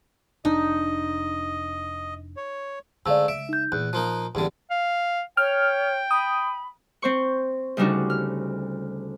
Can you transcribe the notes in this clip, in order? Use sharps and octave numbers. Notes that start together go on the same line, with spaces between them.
F1 D4 D#4 D#5
C#5
G#2 D3 A3 D5 F5 E6
C#2 E5 D7
D#4 G6
E2 A#2 F#6
F3 A#3 D#4
G#1 E2 G2 D3 E3
F5
C#5 G5 F6
B5 D#6
C4 C5 C#6
D2 C#3 G3 D4 D#4 F#4
F6